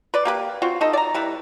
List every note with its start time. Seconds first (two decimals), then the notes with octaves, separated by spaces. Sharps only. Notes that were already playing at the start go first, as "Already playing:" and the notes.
0.14 B4 D5
0.25 A#3 G4 B4
0.62 C4 F4 F#4
0.81 D#4 A4 D#5
0.93 D5 A#5
1.14 G3 E4 B4